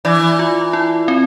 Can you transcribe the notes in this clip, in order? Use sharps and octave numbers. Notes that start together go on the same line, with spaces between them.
E3 D5
F4
E4
C4